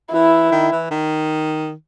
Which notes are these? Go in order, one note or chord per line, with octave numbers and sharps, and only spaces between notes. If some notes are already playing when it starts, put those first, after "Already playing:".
E3 E4
D#3
E3
D#3